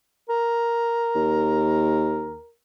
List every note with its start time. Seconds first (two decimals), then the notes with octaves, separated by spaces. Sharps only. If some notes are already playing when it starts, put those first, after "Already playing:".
0.30 A#4
1.15 D#2